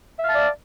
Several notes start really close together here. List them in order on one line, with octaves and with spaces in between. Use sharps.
E5 F5 A5 D5